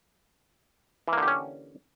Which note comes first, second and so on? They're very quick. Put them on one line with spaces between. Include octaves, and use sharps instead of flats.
E3 A#3 D3 G4 C#4